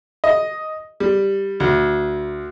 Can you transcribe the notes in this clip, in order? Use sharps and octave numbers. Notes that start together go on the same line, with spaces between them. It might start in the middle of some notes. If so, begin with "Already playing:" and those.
D#5
G3
D2